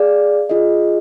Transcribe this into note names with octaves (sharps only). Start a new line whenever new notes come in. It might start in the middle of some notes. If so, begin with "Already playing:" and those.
Already playing: G#4 D5 F5
F4 G#4 D#5